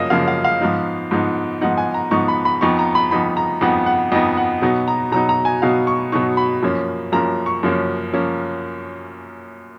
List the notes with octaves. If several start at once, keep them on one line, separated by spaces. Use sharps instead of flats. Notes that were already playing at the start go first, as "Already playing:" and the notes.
Already playing: F#2 C#3 F3 A#3 D#5 F5
F#2 C#3 F3 A#3 F5
F5
F5
G#2 F3 B3 D#4
G#2 F3 B3 D#4
G#2 F3 B3 D#4 F#5
G#5
A#5
G#2 F3 B3 D#4 C#6
B5
B5
F2 F3 B3 D#4 C#6
A#5
B5
F2 F3 B3 D#4 B5
A#5
F2 F3 B3 D#4 F#5
F#5
F2 F3 B3 D#4 D#5
F#5
B2 F#3 B3 D#4
A#5
B2 F#3 B3 D#4 A#5
A#5
G#5
B2 F#3 B3 D#4 F5
C#6
B2 F#3 B3 D#4 C#6
B5
F#2 F3 A#3 C#4
F#2 F3 A#3 C#4 A#5
C#6
F#2 F3 A#3 C#4
F3 A#3 C#4